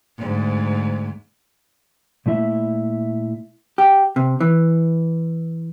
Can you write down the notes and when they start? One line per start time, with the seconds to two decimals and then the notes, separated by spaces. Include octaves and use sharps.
0.17 D2 G#2
2.26 A#2 A3 E4 E5
3.78 G4
4.16 C3
4.40 E3